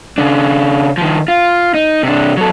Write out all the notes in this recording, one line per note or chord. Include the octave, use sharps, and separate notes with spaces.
C#3 D4
D#3 F3
F4
D#4
C3 D4
F#3 A4